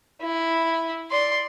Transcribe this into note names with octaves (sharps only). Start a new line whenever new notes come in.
E4
D5 C6